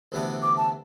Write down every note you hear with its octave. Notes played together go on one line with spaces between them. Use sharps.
D2 C3 E3 B3 D4
D6
A5